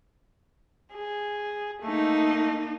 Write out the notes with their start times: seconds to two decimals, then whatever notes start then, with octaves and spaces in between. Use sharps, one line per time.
0.94 G#4
1.82 A3 A#3 D#4